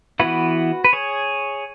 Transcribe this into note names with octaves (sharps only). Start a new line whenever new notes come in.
E3 B3 E4 F#4 B4
B4
G#4 C#5